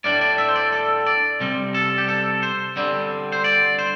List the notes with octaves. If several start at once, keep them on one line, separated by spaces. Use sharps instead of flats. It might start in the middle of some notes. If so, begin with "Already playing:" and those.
A2 G3 D4 D5
D5
E5
C5
D5
A4
D5
C3 G3 C4
A4
G4
A4
C5
D3 G3 C4
C5
D5
C5